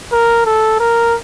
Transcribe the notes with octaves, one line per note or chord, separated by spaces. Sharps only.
A#4
A4
A#4